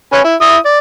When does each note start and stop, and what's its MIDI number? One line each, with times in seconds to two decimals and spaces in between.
0.13 0.20 61
0.13 0.20 71
0.13 0.20 73
0.24 0.35 64
0.41 0.57 64
0.41 0.57 87
0.65 0.79 74